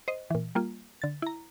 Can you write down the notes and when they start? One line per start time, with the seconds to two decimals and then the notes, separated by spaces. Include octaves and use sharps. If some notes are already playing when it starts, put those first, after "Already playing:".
0.08 C5 D#5
0.30 A#2 E3
0.55 G3 A#3 F4
1.02 D3 A6
1.22 E4 A#5